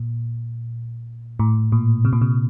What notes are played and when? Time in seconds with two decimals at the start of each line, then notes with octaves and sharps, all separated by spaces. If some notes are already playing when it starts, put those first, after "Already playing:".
Already playing: A#2
1.39 A2
1.72 A#2
2.05 C3
2.13 A#2
2.22 C3